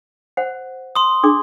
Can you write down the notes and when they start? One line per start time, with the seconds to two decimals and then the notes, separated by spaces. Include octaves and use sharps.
0.37 C5 F#5
0.95 C6 D#6
1.23 D4 G#4 D6